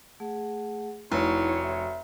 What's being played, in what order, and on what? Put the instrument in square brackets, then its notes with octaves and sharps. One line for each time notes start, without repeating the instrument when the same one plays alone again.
[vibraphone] A3 G#4 F#5
[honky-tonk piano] F1 [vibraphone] A3 D#4 E4 [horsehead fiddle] F#4 C#5
[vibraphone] E5